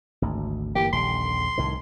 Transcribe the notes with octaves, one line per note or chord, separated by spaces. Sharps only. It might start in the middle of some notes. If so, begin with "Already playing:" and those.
G#1 D2
G1 E3 A#3 G4
D#1 A#1 D3 C6
C2 A2 D#3